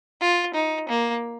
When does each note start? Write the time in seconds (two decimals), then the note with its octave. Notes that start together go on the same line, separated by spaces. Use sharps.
0.21 F4
0.54 D#4
0.89 A#3